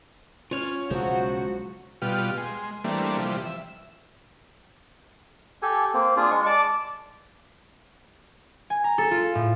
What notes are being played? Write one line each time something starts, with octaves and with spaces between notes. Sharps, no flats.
C#4 F4 C#5 F6
B1 C#3 F3 F#3 G#3 F#4 C5
B2 G3 F4
G#3 C6
E3 G3 A3 A#3 C4 D4
C3 E3 F3 G3
E5
G4 A4 G#5
A#3 C4
D4 F4 G#4
G#3 C#6
D5 A5 D6
G#5
A#5
A4
F4
A2